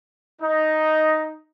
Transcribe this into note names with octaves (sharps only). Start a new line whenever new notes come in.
D#4